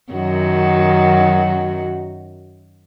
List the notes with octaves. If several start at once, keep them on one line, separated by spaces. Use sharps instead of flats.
F#2 D#3 F#4